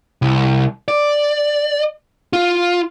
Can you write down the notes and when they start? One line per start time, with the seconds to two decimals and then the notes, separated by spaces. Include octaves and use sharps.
0.22 C2
0.88 D5
2.33 F4